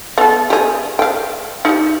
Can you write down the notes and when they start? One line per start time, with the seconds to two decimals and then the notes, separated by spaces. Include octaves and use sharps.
0.18 B3 A4
0.50 G4 G#4
0.99 F5 G5
1.65 D#4 G4